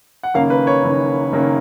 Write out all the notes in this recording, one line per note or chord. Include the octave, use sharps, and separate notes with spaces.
F#5
F#1 F#2 D#3 A#3 C#4 F5
B4
C#5
F#1 F#2 D#3 A#3 C#4
F#1 F#2 D#3 A#3 C#4